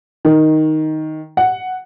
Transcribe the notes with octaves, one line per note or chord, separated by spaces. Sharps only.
D#3
F#5